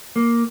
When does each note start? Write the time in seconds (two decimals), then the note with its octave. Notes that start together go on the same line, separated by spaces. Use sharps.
0.16 A#3